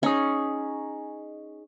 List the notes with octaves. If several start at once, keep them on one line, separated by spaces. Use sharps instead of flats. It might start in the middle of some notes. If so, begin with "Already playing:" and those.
C#4 D#4 G#4